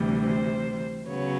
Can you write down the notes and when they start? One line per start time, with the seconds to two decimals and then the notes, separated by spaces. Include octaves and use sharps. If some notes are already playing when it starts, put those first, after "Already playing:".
Already playing: D2 C3 E3 G3
0.24 C5
1.07 C#3 F#3 B3 C#5